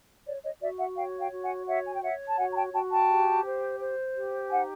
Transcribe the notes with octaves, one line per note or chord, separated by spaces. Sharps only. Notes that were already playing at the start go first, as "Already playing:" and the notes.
C#5 D5
C#5 D#5
F#4 D5 E5
E5 F#5
C#5 F5 G5
F5 G5
F#4
F#5 G#5
C#5 E5 F#5
G#5
G5
C#5 E5 F#5
A5
F#4 F#5 G#5
A#5
G5 A5
F#4 G5 A5
G5 A5
G4
C5
C5
G4
D#4 F#5 G#5